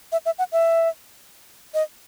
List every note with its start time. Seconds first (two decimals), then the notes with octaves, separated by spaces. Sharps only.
0.12 E5
0.26 E5
0.39 F#5
0.52 E5
1.74 D#5